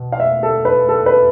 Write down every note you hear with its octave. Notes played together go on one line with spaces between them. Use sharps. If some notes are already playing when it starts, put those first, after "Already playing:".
Already playing: B2
F5
E5
A4
B4
A4
B4